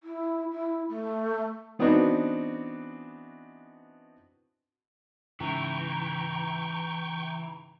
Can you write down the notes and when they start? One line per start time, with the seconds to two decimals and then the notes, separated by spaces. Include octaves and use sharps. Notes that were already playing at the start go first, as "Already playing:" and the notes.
0.03 E4
0.51 E4
0.89 A3
1.79 E3 B3 C4 D4 D#4 F#4
5.40 G#2 C#3 E3 G5 A#5 C#6